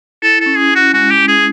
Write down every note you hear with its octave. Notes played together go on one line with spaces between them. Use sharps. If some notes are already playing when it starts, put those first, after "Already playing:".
E4 A4
A4
C#4
G#4
C#4
F#4
G#3 F#4
G4
C#4
G#4